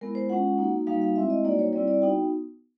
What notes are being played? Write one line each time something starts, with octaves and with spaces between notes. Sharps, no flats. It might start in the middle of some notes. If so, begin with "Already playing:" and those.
G#3 B3 E4 A#4
C5
G#3 C#4 F4 F#5
A#3 D#4 F#4
G3 A#3 D#4 F#4 F5
F5
G#3 C4 E4 E5
D#5
G3 A#3 D#4 F#4 D5
C#5
G3 C4 E4 D5
D5
B3 D#4 F#4 G5